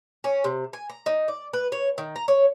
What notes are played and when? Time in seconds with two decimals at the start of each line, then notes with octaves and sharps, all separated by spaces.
0.24 C#4
0.44 C3
0.73 G#5
0.90 A#5
1.06 D#4
1.28 D5
1.53 B4
1.72 C#5
1.98 D#3
2.16 A#5
2.28 C#5